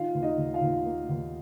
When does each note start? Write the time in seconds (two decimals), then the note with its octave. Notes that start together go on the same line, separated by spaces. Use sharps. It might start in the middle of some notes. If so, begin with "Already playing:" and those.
Already playing: D#3 F4 F5
0.15 D#2
0.23 D#4 D#5
0.38 D#2
0.54 F4 F5
0.62 D#2
0.86 A#3
1.09 D#2